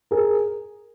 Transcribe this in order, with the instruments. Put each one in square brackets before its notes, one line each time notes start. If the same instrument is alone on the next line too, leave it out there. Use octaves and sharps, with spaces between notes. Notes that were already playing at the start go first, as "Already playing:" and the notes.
[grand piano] G#4 A#4